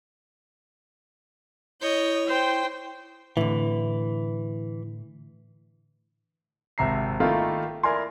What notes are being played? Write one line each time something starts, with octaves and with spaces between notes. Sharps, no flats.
E4 C#5 D#5 G6
C5 G5
A2 D3 E3
G#1 C3 E5 A#5 C7
D#3 A3 A#3 E4 F4
E4 A#4 D5 G#5 C6